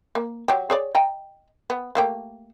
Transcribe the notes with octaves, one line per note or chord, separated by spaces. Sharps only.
A#3
F#3 G4
G#4 C#5 D5
D#5 G5 A#5
B3
A3 A#3 G4